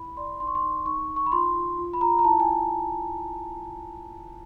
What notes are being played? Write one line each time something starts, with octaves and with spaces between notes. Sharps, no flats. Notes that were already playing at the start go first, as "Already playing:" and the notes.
Already playing: E4 B5
D5 C6
D#4 C6
C#6
C6
D#4
D#4 C#6
D#4
C#6
B5
F4 C6
F4
F4
B5
F4 A#5
A#5
E4 A5
G#5